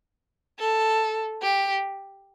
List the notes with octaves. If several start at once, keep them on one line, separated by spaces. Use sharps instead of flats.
A4
G4